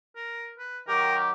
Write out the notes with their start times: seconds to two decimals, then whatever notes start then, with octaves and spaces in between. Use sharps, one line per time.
0.16 A#4
0.59 B4
0.88 D#3 F#3 G4 A#4